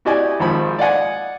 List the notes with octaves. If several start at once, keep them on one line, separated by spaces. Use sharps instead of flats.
E4 F#4 G4 D5 D#5 G#5
G#1 D#3 F3 B5
D5 D#5 F5 F#5 G#5